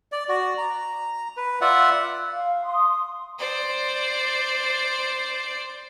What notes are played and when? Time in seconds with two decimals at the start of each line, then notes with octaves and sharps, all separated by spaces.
0.12 D5
0.29 F#4 D5
0.58 A#5
1.37 B4
1.61 F4 D5 E5 F#5
2.34 F5
2.64 C6 D#6
3.39 C5 D5